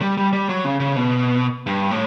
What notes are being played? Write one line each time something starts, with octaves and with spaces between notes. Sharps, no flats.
G3
G3
G3
F#3
C#3
C#3
B2
G2
A2